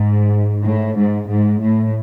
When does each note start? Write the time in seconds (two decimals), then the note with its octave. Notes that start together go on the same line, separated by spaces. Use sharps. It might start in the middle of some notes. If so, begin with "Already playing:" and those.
Already playing: G#2
0.65 A2
0.97 G#2
1.29 G#2
1.62 A2